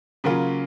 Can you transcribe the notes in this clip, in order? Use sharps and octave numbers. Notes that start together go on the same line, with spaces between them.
C#3 F#3 A#3 C#4 F4